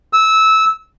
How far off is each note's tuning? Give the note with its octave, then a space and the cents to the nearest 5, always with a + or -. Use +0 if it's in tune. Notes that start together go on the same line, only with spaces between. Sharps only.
E6 -20